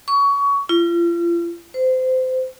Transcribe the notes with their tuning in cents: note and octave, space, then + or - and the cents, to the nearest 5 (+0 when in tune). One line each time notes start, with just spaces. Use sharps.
C#6 +25
F4 -40
C5 -25